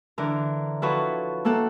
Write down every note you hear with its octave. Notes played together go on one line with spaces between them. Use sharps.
D3 E3 A#4
F3 E4 F#4 A4 B4 C#5
A3 A#3 A4 F#5